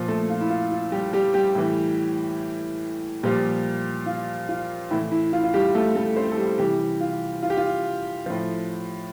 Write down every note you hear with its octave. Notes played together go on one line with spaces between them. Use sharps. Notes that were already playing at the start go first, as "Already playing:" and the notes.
Already playing: A#2 F3
A3 A4
F4
E4
F4
F4
G3 G4
G3 G4
G3 G4
A2 E3
A#2 F3 G3 G4
F4
F4
A2 E3 E4
E4
F4
F4
G3 G4
A3 A4
A3 A4
C4 C5
A4
G3 G4
C3 E3 G3 G4
F4
F4
G4
F4
A2 F3